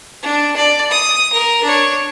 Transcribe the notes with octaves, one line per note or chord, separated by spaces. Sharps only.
D4
D5
D#6
A#4
D4 C#5